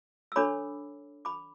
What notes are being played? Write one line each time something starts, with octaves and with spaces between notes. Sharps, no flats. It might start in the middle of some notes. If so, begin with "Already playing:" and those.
E6
D4 A4 C#5 B5 D6
B5 D6